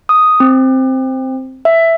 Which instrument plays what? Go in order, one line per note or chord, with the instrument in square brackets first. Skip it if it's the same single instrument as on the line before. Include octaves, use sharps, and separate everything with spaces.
[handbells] D#6
C4
E5